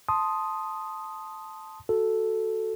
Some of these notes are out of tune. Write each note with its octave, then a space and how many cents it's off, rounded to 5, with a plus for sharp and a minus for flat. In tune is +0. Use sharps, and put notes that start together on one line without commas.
A5 -5 C6 +0 D#6 +0
F#4 +0 A4 +0